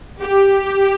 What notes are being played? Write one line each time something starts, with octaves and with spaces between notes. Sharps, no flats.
G4